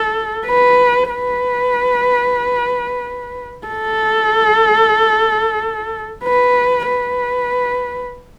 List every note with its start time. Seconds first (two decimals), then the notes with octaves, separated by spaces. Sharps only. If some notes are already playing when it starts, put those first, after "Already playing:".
Already playing: A4
0.46 B4
1.10 B4
3.68 A4
6.24 B4
6.88 B4